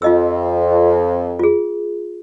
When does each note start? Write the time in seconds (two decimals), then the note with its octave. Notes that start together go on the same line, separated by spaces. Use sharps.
0.02 F2 F4 D#5 E6
1.39 F4 G#4